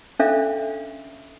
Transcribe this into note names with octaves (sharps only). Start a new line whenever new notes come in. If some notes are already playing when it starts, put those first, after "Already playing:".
C#4 D4 A4 D5 E5 F5